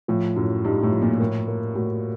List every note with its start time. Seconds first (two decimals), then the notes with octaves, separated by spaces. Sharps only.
0.08 A2 F3
0.36 F#2 A2
0.64 G2 D#4
0.83 A2
0.92 F3
1.02 A#2
1.19 A2 A#4
1.48 A#3
1.75 A2 F#4